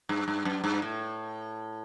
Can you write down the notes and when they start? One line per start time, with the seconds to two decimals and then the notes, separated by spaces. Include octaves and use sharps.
0.09 G2
0.28 G2
0.45 F#2
0.64 G2
0.82 A2